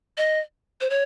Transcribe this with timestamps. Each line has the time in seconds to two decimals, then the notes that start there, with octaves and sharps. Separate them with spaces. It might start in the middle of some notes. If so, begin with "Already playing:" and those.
0.18 D#5
0.81 C5
0.90 C#5